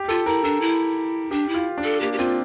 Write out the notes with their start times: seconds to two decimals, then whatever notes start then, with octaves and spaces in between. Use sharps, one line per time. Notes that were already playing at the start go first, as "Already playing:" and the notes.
Already playing: G4
0.08 F4 A4
0.26 E4 A#4
0.44 D4 A4
0.61 E4
1.31 D4 G4
1.49 E4
1.54 F4
1.78 D4
1.84 A4
2.01 A#3 G4
2.13 G4
2.18 C4 F4